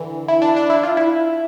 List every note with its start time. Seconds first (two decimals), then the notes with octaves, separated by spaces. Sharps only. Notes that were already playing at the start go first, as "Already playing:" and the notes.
Already playing: D3 E3
0.28 E4
0.42 D4
0.57 D4
0.70 E4
0.83 F4
0.97 E4